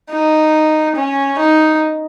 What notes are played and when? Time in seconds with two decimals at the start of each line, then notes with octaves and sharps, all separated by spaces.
0.12 D#4
0.96 C#4
1.39 D#4